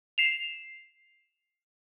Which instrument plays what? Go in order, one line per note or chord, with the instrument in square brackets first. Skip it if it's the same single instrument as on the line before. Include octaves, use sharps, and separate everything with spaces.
[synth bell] C7 E7 F7